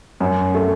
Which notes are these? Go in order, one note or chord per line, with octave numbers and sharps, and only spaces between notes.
F#2
A3